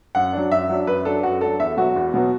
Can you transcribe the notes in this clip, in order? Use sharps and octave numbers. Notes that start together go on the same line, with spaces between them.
F#2 F#5
F#3 D4
F#2 E5
F#3 D4
F#2 B4
F#3 D4 A4
F#2 F#4
F#3 D4 A4
E2 E5
B2 F#3 B3 F#4
E2
B2 F#3 B3